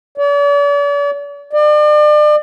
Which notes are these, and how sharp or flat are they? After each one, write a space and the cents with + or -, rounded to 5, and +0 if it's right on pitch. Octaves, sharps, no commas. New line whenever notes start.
D5 -45
D5 +35